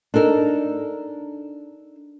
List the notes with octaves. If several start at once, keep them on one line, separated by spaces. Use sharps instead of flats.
D4 D#4 A4 A#4